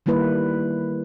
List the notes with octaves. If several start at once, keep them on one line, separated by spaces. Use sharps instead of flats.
D#3 G3 A#3 E4 B4